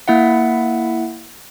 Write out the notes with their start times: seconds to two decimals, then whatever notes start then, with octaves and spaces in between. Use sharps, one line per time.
0.08 A#3 E4 E5 F#5